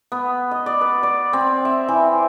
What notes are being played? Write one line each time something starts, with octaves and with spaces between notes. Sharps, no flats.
B3
D#5
D5
B4
D5
C4
E5
E3